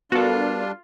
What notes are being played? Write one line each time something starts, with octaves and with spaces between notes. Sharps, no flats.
G3 B3 D4 F4 F#4 A4 A#4